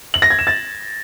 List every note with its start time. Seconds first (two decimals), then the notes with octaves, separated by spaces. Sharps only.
0.14 F#7
0.22 A#6
0.30 G#6
0.39 E7
0.47 A6